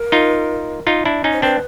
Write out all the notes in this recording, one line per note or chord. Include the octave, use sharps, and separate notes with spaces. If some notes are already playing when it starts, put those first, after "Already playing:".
Already playing: A#4
D#4 F4
D#4 F4
D4 E4
C#4 D#4
C5
C4 D4 B4